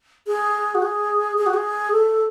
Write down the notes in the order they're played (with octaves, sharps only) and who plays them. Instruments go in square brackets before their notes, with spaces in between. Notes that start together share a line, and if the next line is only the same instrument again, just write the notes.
[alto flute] G#4
F#4
G#4
G#4
F#4
G#4
A4